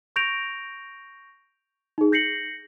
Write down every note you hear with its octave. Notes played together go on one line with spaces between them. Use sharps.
C#6 G6 A#6 D7 F7
D#4 G#4
G6 A#6 C7 C#7 F#7